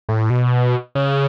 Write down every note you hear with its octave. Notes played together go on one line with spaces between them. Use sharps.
A2
B2
C#3